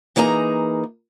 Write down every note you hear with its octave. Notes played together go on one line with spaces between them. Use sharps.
E3 A#3 D#4 G#4 A#5